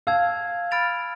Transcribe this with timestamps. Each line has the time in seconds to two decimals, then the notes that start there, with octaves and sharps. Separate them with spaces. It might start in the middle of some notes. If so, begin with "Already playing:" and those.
0.07 F5 A5 E6 G#6
0.71 B5 F6 A6 D7 F7